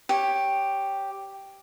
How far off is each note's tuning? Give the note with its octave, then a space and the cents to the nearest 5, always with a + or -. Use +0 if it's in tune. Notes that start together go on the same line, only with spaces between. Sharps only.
G4 +0 C#5 -10